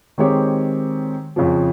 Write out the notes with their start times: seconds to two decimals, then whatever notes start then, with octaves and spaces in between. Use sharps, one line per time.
0.18 D#3 G#3 C4 G4 C#5
1.36 F2 C#3 F3